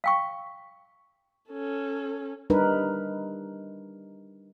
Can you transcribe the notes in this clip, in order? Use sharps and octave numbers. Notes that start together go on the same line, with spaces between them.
F5 G5 C#6
C#4 A4
G3 D4 D#4 A#4 B4